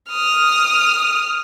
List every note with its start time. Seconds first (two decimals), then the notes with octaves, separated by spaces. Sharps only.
0.10 D#6 F6